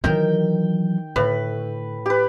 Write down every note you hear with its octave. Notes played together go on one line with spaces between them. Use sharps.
D#3 E3 F#3 A#4 G5
A2 D3 B4
G4 B4